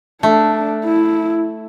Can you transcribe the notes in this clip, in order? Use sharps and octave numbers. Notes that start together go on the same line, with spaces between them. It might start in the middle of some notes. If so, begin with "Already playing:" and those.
A3 D4
E4